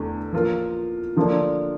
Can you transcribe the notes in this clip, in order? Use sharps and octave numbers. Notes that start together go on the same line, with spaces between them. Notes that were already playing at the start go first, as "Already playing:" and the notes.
Already playing: E2 D3 A3
F3 A#3 F4 A#4
D3 F3 A#3 D4